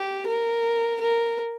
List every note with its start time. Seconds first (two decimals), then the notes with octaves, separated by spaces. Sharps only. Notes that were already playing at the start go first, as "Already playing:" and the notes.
Already playing: G4
0.27 A#4
1.01 A#4